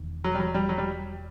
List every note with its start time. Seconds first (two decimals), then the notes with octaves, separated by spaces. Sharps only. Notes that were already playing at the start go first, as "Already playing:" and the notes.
Already playing: E1 E2 D#3
0.24 F#3
0.35 G3
0.40 F#3
0.54 G3
0.69 F#3
0.78 G3